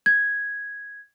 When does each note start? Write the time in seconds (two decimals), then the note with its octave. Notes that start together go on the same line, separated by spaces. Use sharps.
0.06 G#6